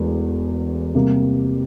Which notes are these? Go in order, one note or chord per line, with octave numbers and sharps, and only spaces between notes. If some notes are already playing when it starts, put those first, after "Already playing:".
Already playing: E1 E2 A3
C3 G3 A#3